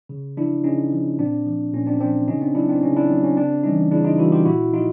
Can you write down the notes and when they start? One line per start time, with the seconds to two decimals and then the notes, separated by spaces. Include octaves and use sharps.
0.09 C#3
0.37 F3 D4 E4
0.64 C#3 C#4 D#4
0.91 F3
1.19 A#2 C4 D4
1.46 F3
1.73 A#2 C#4
1.86 C4 D4
2.00 F3 C4 D4
2.28 C#3 C#4 D#4
2.41 C4 D4
2.55 F#3 D4 E4
2.69 C4 D4
2.82 C#3 C#4 D#4
2.96 D4 E4
3.09 F#3 C4
3.24 C#4
3.36 C#3 C4 D4
3.64 E3 G3 C#4 D#4
3.91 C#3 D4 E4
4.04 D#4 F4
4.18 E3 G3 E4 F#4
4.32 F4 G4
4.45 A#2 E4 F#4
4.73 F3 D#4 F4